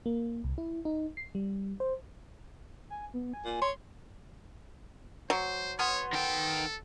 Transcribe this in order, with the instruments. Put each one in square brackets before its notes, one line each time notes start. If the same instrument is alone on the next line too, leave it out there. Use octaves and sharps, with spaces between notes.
[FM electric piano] A#3
C2
E4
D#4
C7
G3
C5
[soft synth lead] G#5
B3
G#5
[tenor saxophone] A#2
[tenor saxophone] C#5 [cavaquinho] C6
[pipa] F#3 [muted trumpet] C5
[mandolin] B3 C6 F6 [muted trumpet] C#5
[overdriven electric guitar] D#3 G5 [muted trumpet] A4